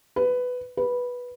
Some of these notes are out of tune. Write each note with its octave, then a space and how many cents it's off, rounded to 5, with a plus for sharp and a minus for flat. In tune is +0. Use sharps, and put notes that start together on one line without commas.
B4 +10
B4 -10